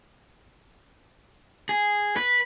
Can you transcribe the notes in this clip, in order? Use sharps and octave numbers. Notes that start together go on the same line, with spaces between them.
G#4
B4